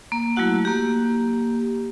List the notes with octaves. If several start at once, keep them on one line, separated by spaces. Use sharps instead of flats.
A#3
F#3 A3 E4 F#4 F#5
A#3 G4